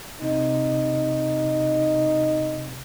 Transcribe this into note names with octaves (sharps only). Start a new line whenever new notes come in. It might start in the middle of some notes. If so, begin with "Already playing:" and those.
C3 D#4